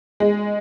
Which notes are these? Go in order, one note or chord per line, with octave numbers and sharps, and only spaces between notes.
G#3